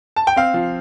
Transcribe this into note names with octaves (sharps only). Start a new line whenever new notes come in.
A5
G5
C4 F5
F3